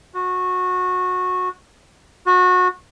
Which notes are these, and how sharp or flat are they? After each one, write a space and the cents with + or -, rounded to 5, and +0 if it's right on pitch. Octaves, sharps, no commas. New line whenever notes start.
F#4 -20
F#4 -25